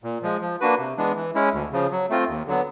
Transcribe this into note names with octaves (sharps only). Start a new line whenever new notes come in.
A#2
F3 G#3
F3
A#3 D4 F#4 B4
C3
E3 G#3 B3 D4
E3
G#3 C#4 E4
D2
C#3 F3
F#3
A3 C4 F4
D#2
D3 F#3 B3